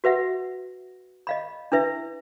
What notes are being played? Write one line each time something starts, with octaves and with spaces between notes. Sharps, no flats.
F#4 B4 E5 F#5
D#5 F5 B5
D4 E4 B4 E5